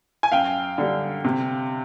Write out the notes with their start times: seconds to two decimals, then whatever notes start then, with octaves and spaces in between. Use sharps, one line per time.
0.23 G#5
0.32 F#2 F5 G5
0.78 D3 G3
1.25 C3